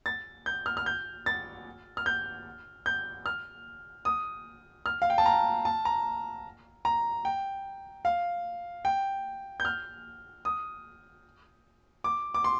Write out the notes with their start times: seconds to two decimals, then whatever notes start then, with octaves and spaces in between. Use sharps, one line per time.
0.06 A6
0.46 G6
0.66 F6
0.77 F6
0.86 G6
1.26 A6
1.97 F6
2.06 G6
2.86 G6
3.26 F6
4.05 D#6
4.86 F6
5.02 F5
5.10 G5
5.18 A5
5.26 A#5
5.65 A5
5.85 A#5
6.85 A#5
7.25 G5
8.05 F5
8.85 G5
9.60 G6
9.65 F6
10.45 D#6
12.04 D6
12.34 D6
12.44 C6